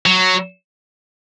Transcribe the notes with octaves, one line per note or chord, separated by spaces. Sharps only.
F#3